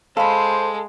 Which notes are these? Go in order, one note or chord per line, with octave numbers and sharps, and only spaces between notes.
G#3 A4 C5 F5 B5